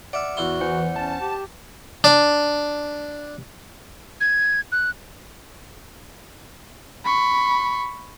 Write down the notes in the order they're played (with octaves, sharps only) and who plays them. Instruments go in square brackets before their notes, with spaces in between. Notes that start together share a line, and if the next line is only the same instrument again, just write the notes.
[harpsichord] D5 E5 [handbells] F#5 F6
[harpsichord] E2 E4 C6 [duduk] F#4
[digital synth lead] E3 [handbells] C5 F#5
[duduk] C#4 [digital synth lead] A5
[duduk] G4
[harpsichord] D4
[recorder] G#6
F#6
[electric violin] B5 C#6